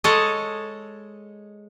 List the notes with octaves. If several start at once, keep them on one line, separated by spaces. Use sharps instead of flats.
G#3 A4 C#5 D#5